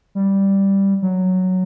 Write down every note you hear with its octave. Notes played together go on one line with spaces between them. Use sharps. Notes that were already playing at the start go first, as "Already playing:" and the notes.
G3
F#3